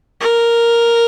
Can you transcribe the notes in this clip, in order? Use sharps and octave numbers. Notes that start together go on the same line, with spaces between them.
A#4